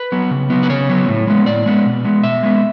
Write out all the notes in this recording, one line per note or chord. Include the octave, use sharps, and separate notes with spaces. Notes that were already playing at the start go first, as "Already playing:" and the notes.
Already playing: B4
F#3 B3
C#3
F#3 B3
B4
C#3 C#5
F#3 B3
A2
G#3 B3
A2 D5
G#3 B3
B2
G#3 B3
B2 E5
G#3 B3